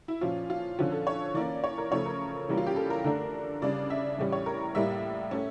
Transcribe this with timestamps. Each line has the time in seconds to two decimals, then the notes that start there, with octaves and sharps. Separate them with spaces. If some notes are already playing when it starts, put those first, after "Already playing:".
0.08 E4
0.21 A#2 F3 C#4 F4
0.50 F4
0.79 D3 F3 C#4 F4
0.92 A4
1.07 C#5
1.34 E3 A#3 C#4 D5
1.64 C#5
1.78 A#4
1.91 C#3 F3 A3 C#5
2.06 A#4
2.49 C#3 E3 G3 A#3 C#4
2.58 F4
2.67 G4
2.76 A4
2.90 A#4
3.04 D3 A3 D4
3.62 C#3 G3 D4 D5
3.90 E5
4.18 A2 E3 G3 C#4
4.32 C#5
4.46 A#4
4.75 A2 G3 A#3 E5
5.31 A3 C#4